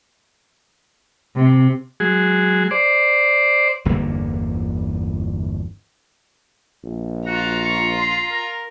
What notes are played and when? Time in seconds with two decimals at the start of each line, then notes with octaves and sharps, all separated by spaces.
1.35 C3
2.00 F#3 G#3 G#4
2.71 C5 D5
3.85 G1 E2 D3 A#3
6.84 A#1
7.26 F4 F#4 A#5
7.64 C#6
7.97 C6
8.31 A#4